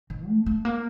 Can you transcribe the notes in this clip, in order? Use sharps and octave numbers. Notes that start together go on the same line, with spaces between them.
D#3
A3
A3
A#3